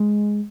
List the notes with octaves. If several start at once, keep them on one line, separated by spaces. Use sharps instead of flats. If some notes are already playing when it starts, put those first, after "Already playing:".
Already playing: G#3